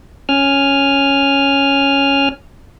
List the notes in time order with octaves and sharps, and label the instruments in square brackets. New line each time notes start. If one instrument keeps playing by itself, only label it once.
[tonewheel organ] C#4 G#5 F6